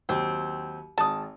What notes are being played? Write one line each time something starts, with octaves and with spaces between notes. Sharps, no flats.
D#2 F#3 C4
G#1 A5 D#6